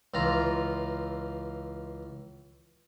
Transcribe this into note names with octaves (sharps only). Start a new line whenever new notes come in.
C#2 E3 F4 A#5